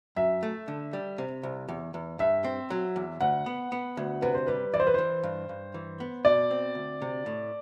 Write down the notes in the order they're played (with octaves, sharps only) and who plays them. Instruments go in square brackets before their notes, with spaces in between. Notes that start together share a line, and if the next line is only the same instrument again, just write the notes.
[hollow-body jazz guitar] F#2 [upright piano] E5
[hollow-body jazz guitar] A3
D3
G3
C3
C2
E2
E2
[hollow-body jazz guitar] G2 [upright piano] E5
[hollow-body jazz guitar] C4
F#3
E2
[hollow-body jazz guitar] D2 [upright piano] F#5
[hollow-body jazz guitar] B3
B3
D2
[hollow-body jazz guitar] C3 [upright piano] B4
[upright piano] C5
[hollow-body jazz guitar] G3 [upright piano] B4
[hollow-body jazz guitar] E3 [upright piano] D5
[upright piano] C5
B4
[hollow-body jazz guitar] E3 [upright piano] C5
[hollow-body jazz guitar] G2
G2
E3
B3
[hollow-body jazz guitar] B2 [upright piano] D5
[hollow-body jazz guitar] C4
D2
C3
A2